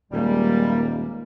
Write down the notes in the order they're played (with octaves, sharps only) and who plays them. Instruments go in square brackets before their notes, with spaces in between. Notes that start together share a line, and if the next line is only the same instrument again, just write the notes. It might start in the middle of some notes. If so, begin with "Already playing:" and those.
[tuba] D#1 [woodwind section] G3 [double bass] G#3 A#3